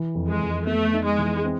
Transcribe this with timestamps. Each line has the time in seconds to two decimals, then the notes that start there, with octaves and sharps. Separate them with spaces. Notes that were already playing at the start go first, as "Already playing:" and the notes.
Already playing: E3
0.15 F2
0.28 G#3
0.41 F2
0.66 A3 B3
0.93 D#4
1.05 G#3
1.18 E3
1.44 C4